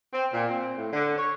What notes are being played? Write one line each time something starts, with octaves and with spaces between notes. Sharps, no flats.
C4
A#2
C4
A2
D3
C#5